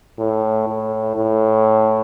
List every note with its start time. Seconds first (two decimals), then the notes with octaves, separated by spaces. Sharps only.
0.19 A2
0.68 A2
1.16 A2